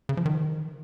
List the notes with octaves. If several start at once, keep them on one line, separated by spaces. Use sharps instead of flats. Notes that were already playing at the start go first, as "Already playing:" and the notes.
C#3
F3
D#3